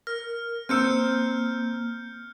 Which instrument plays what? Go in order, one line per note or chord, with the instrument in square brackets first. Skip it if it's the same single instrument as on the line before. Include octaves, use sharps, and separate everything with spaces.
[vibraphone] A#4 [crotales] F6
[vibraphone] A#3 [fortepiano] C4 E6 [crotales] F6 G6 C#7